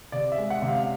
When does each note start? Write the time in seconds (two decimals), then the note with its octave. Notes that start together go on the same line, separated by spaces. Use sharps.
0.12 C3 D5
0.32 E5
0.38 G#3
0.50 F#5
0.62 C3
0.68 F5